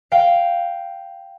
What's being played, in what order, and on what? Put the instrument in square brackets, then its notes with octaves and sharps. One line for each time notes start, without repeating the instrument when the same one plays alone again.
[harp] F5 G5